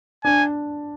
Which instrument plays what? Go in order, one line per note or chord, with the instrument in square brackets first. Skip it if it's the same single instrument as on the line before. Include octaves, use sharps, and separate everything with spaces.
[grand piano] D4 [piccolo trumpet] G#5